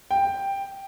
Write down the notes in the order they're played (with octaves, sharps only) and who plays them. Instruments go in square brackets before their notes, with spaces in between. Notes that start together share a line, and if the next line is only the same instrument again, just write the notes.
[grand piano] G5